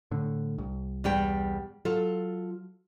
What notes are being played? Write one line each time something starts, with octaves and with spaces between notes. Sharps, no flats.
A2 D3
C2
E2 G3 G5
F#3 F4 A4